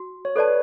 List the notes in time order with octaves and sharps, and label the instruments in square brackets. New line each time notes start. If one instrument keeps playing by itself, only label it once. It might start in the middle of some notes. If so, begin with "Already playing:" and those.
Already playing: [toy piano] F#4
[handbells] C#5
[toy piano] A4 D5 A5 [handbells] B4